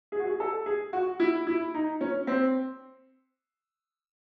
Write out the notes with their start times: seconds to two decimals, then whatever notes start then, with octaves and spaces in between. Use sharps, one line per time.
0.12 G#4
0.20 F#4
0.27 G#4
0.40 A4
0.66 G#4
0.93 F#4
1.20 E4
1.47 E4
1.74 D#4
2.01 C#4
2.27 C4